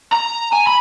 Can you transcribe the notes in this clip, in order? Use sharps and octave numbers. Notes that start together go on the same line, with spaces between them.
A#5
G#5
B5